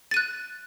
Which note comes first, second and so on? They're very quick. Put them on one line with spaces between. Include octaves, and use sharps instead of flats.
A6 D#7 F#6